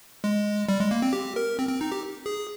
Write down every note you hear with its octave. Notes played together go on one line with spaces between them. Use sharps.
G#3
G3
G#3
A#3
C4
G4
A#4
C4
C4
D#4
G4
G#4